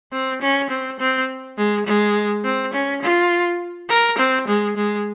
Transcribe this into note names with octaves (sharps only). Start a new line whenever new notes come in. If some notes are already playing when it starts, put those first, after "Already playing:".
C4
C#4
C4
C4
G#3
G#3
C4
C#4
F4
A#4
C4
G#3
G#3